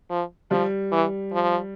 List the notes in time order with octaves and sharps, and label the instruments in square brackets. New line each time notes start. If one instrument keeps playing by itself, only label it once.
[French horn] F3
[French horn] F3 [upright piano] G3
[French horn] E3
F3